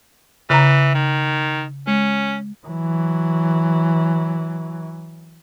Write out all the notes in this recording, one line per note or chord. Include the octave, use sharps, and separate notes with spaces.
C#3 E3 A#5
D#3
G#3 C#4
E3 F#3